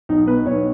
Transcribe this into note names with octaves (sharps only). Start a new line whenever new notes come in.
B1 D#4
B2 B4
B1 C#5